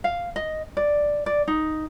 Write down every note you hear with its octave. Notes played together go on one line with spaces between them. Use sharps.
F5
D#5
D5
D5
D#4